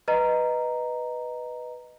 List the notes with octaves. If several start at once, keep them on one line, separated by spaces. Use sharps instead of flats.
B4 D#5 A#5